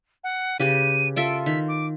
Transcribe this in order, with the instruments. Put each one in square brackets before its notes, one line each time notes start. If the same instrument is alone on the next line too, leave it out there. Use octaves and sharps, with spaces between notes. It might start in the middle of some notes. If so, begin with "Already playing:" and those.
[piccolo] F#5
[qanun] C#3 G4 B4 [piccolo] D#7
[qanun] F4 A4 E5 [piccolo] D7
[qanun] D#3 [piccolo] B6
[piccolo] D6